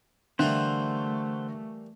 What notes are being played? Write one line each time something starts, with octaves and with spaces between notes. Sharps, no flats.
D3 E3 G3 A3 A#3 C5 F#5